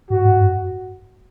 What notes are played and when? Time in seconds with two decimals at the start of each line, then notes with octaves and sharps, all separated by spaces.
0.10 G#2 F#4
0.25 G#2
0.40 F#2